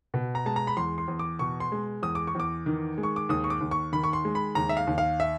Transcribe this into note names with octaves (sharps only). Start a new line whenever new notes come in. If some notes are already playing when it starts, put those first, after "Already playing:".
B2
A#5
G#3 A5
A#5
B5
E2 C6
C6
E2
D6
B2 C#6
C6
G#3
E2 D#6
D6
C#6
E2 D6
D#3
G#3
C#6
D6
D#2 D#6
C#6
D6
D#2
C#6
D#3 B5
C#6
C6
G#3
B5
D#2 A#5
E5
F5
D#2
F5
E5